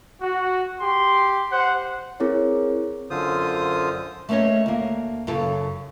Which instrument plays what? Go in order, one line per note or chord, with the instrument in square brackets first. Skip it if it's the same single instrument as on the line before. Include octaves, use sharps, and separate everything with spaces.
[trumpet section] F#4
G4 C6
C5 F#5
[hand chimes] C4 E4 G#4 A#4 C#5
[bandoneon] F#2 D3 F4 C5 D#6
[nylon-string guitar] A3 A#3 C#4 C#5 D#5
D2 A#3
F#2 C#3 A4